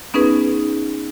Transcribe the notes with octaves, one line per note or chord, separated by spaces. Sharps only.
B3 C#4 D#4 G#4 B4